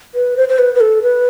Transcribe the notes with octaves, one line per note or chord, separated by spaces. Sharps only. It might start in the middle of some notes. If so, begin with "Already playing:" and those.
B4
C5
C5
B4
B4
A4
B4